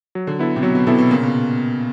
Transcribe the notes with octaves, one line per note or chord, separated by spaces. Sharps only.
F#3
D3
B3 E4 A4
C3
B2 F#3
B2
C3 B3 E4 A4
B2
A#2 C#3
B2